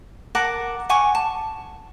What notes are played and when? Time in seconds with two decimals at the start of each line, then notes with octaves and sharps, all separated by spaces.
0.35 A#4 F#5 A5 D6
0.89 F#5 G#5 C#6 D6
1.15 A5